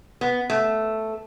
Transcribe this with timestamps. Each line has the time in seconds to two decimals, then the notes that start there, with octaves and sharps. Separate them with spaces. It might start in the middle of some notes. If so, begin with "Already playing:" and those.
0.21 B3
0.50 A3